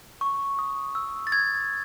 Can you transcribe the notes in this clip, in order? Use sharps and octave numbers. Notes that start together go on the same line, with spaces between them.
C#6
D#6
E6
A6
G#6